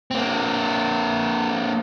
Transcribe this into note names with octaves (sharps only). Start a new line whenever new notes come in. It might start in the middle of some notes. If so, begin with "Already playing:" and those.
A#3 C4